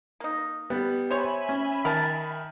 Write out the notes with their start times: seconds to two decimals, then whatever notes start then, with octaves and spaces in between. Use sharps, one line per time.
0.20 A#3 D#4
0.70 G3 B3
1.11 C5 C#5 E5 G#5 B5
1.49 C#4
1.85 D#3 A#4 A5